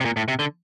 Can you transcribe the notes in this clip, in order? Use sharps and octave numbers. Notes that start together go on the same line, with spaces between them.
C3
A#2
A2
C3
D3